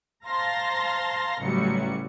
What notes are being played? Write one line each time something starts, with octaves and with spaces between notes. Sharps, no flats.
C5 F5 A5 A#5 C6 A#6
A1 A2 C#3 F#3 G3 C#7